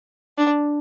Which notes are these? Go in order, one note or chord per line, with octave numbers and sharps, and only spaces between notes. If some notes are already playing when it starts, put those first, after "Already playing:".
D4